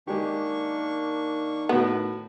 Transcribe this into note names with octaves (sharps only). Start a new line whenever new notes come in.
D#3 G#3 A#3 D4 G4 C#6
A2 B3 F#4 F#5